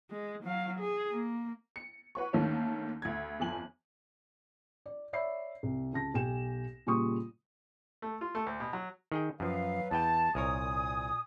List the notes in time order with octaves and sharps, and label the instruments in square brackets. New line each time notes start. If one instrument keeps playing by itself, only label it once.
[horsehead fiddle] G#3
F#3 F5
G#4
A#3
[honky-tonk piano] C#7
F#4 B4 C#5 C#6
D#2 D3 D#3 A3 A#3 C#4
D2 G#6
G1 F2 G#5 F#7
[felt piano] D5
C#5 D5 E5 B5 C7
C2
C#2 A5 A#6
B1 G4 G5 G#5 E7
A#2 C#3 G3 C6 C#6 D#6
[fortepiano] A3
F4
A3
D2
B2
F#3
[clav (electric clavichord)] D#3 G#4 G5
[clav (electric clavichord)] F#2 F3 [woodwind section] F#3 B4 F5
[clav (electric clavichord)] E2 B4 G5 [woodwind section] A5
[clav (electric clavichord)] C2 A#4 C#5 [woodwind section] A#2 G#5 D#6